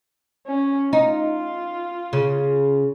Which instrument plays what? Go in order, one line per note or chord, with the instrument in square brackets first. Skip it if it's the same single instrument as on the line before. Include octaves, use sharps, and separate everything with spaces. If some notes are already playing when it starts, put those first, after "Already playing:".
[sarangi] C#4
[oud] D#4 [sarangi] F4
[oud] C#3